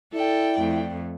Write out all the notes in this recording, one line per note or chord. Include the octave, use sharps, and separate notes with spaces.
E4 A4 D5 G5
F2 A3